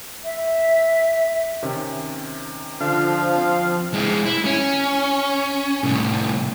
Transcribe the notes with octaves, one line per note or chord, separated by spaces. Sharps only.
E5
C3 D#3 C#4
D3 F3 D4 F5
C4
G#3 E4
E4
C#4
C2 A2